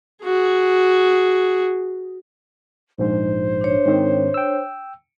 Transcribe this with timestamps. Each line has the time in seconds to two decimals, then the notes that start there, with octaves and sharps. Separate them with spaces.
0.24 F#4 G#4
2.98 A#1 G#2 C5
3.61 D4 C#5
3.86 G#2 D#3 C4
4.34 G5 E6